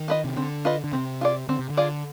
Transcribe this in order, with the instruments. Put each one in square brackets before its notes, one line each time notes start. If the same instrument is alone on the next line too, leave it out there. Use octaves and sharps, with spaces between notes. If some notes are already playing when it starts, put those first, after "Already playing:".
Already playing: [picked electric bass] D#3
[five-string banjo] F4 B4 D#5
[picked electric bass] C3
[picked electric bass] D3 [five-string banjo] C4
[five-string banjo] F4 B4 D#5
[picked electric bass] D3
[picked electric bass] C3 [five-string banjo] C4
[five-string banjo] F4 G#4 D5
[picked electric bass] D3 [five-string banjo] C4
[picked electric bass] C3
D3
[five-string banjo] F4 G#4 D5